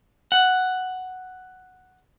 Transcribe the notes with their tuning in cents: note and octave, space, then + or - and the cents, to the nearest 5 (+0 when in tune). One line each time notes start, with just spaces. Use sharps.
F#5 +5